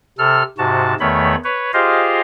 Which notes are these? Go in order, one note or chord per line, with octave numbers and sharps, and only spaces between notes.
C3 A4 F6
G#2 C3 F#4 A5
E2 D#3 A3 C#5 B5
B4 C#5
F4 G4 G#4 C5 D#5 F5